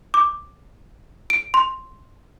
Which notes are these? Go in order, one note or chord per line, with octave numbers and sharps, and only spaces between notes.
D6
D7
C6